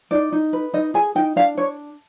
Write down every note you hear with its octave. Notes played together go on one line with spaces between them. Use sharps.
D#4 D5
D#4
B4
D#4 D#5
G#4 G#5
D#4 G5
D4 F5
D4 C#5